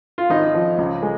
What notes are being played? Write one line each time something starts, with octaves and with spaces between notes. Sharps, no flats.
F4
G#1 D#4
F3
C#2
G#3